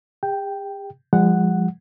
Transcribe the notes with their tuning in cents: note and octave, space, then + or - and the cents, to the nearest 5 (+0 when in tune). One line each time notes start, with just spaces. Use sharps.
G4 +45 G5 +0
F3 +0 G#3 -40 F#5 +0